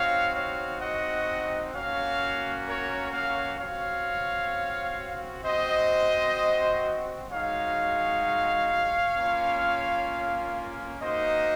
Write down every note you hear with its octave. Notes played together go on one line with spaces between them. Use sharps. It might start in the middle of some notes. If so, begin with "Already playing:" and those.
Already playing: C4 D#4 F#4 C#5 F5
C#5 F5
D#5 F#5
A#3 C#4 F#4 C#5 F5
A#4 C#5
C#5 F5
C4 F#4 C#5 F5
C4 F#4 C5 D#5
G#3 D#4 F#4 C#5 F5
A#3 C#4 F4
A#3 D#4 F#4 C5 D#5